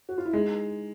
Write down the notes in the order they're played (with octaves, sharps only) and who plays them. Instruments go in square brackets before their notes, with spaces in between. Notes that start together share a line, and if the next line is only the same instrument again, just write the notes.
[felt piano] F#4
F4
E4
[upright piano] G#3 [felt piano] D#4